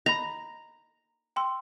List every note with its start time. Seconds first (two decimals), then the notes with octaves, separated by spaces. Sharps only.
0.06 D#5 A#5 B5
1.36 G5 C6 E6